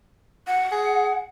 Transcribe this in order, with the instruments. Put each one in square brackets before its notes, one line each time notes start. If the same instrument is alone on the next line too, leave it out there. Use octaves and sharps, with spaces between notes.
[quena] F#5
[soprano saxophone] G#4